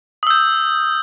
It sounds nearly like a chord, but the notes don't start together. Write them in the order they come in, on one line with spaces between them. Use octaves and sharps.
D#6 E6 G6